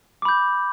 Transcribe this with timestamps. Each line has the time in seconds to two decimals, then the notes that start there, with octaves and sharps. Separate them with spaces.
0.22 D6
0.25 B5
0.29 G6